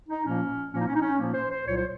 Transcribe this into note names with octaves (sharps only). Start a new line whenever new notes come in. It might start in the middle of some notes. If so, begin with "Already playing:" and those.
D#4
A#2 F3 A#3 C#4
A#2 F3 A#3 C#4
D#4
C#4
D#4
C#4
A#2 F3 A#3
C5
C5
C2 A#2 F#3 C#5
C5